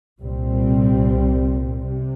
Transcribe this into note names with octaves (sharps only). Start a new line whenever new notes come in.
C2 A#2 G3 C4
C3